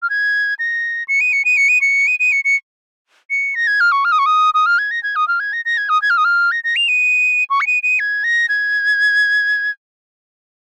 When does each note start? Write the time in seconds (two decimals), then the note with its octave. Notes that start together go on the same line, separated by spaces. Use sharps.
0.03 F6
0.10 G#6
0.59 A#6
1.08 C#7
1.21 D#7
1.33 C#7
1.45 D#7
1.57 C#7
1.69 D#7
1.81 C#7
2.07 D#7
2.20 D#7
2.32 C#7
2.45 C#7
3.30 C#7
3.55 A#6
3.67 G#6
3.80 F6
3.92 C#6
4.05 F6
4.12 D#6
4.19 C#6
4.26 D#6
4.54 D#6
4.66 F6
4.78 G#6
4.91 A#6
5.03 G#6
5.16 D#6
5.28 F6
5.40 G#6
5.53 A#6
5.65 A#6
5.78 G#6
5.89 D#6
6.02 G#6
6.10 F6
6.17 D#6
6.25 F6
6.52 A#6
6.64 A#6
6.76 F7
6.88 D#7
7.50 C#6
7.61 C#7
7.67 D#7
7.83 D#7
7.99 G#6
8.24 A#6
8.49 G#6